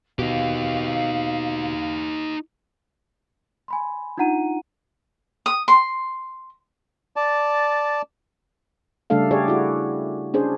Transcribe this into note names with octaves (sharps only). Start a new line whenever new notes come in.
B2 D#4 G4 F5
G#5 B5 C6
D4 D#4 F4 F#5 A#5 D#7
D#6
C6
D5 A5
C#3 G3 A3 D4 A4 F5
G4 G#4 C#5 D5
E4 F#4
C#4 D4 G#4 C5